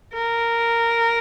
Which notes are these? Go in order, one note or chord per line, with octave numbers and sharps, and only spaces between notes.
A#4